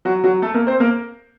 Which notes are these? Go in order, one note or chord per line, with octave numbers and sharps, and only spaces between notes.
F#3 F#4
F#3 F#4
A3 A4
A#3 A#4
C4 C5
A#3 A#4